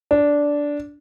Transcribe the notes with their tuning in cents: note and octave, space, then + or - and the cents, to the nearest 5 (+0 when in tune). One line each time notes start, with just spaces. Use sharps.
D4 -10